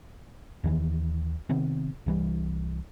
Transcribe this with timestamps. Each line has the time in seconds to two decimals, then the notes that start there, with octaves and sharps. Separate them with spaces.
0.64 D#2 D#3 E3
1.49 C3 D#3 B3 C4
2.06 C2 E3 G3